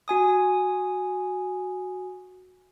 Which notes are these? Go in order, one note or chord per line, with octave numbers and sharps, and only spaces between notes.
F#4 G#5 D#6